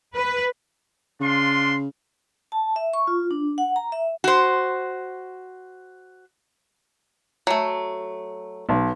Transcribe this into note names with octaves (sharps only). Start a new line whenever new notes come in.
B4
C#3 D4 F4 C6
A5
E5
C#6
F4
D4
F#5
A#5
E5
F#4 C5
F#3 A3
B1